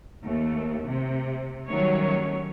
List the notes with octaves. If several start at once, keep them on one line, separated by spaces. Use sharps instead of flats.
D#2 A3
C3
D#3 F#3 G3 A3 C#4 C#5